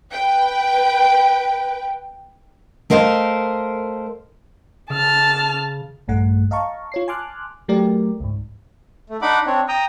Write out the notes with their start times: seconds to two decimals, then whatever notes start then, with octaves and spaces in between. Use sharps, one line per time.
0.13 B4 G5
2.90 A3 A#4 C5 D#5 F5
4.90 C#3 A5 F6
6.08 A#1 G2 A3 F#5
6.51 D#5 F5 A5 A#5 C#6
6.92 F4 C#5 C7
7.08 G#5 A5 C6 D6 F6 F#6
7.68 F#3 A3 G4 A#4 D5
8.20 C#2 G#2
9.10 A3
9.22 D4 D#4 F#5 B5 D6
9.46 C4 D4 C#5
9.68 G5 A#5 D#6